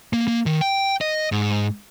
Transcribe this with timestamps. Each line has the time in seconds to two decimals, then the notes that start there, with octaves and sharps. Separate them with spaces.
0.13 A#3
0.27 A#3
0.46 D#3
0.61 G5
1.01 D#5
1.32 G#2